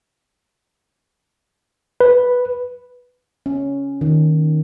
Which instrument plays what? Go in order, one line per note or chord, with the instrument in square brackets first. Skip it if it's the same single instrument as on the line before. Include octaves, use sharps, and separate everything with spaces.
[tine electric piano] B4
[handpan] C#4
D#3